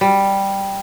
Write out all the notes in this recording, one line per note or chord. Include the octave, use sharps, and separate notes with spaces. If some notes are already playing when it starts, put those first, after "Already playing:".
G3